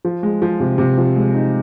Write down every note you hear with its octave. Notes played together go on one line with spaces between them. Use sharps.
F3
G#3
F3
C3
C3
F3
G#3
D#4